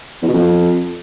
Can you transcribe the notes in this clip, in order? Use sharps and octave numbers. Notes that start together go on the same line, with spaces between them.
E2
B2
F2